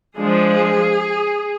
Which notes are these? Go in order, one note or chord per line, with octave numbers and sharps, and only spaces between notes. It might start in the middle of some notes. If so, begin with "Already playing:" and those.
F3 G#3 D4 G#4